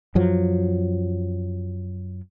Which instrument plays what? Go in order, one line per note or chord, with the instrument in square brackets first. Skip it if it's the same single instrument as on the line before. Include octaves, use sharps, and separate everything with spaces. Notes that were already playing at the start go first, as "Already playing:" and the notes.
[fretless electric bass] F#2 F3 F#3